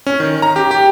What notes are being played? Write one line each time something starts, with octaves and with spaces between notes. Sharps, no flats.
C#4
D#3
A#5
G4
G4